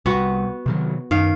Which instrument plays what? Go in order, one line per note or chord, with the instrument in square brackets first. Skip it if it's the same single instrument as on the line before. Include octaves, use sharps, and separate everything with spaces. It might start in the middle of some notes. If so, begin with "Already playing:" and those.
[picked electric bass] C2 [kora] B3 F#4
[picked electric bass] C3 D#3 F#3
[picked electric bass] F#2 [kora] D#3 F5